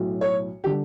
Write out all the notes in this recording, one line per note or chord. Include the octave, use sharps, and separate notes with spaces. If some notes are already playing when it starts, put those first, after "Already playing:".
Already playing: B1 A2 F#3
C#5
D3 G3 G4